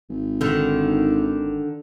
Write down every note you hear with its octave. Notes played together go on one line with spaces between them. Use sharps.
G#1
D3 D#3